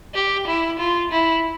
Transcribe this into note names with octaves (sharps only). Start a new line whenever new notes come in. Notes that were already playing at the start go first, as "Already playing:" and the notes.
G4
E4
F4
E4